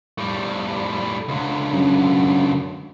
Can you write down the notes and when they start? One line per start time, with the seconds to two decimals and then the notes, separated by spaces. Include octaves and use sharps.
0.18 A2 G3
1.29 C#2 D3
1.73 F#2